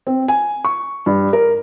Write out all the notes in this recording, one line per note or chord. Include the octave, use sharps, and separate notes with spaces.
C4
G#5
C#6
G2
A#4